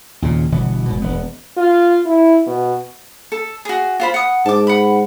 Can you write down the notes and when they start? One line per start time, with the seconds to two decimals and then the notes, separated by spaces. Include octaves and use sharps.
0.22 D#2 A#2 C#3
0.52 G1 B2 E3 B3
0.86 E1 G#2 B2
1.02 E1 B3
1.57 F4
2.05 E4
2.46 B2
3.32 A4
3.65 F#4 G#4
4.00 F4 C5 B5
4.14 F#5 D#6
4.46 G#2 A5 D6
4.67 F#5 B5